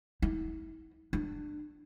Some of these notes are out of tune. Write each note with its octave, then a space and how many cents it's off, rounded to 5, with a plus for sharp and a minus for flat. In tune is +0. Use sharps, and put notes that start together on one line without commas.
E4 -45
D4 +25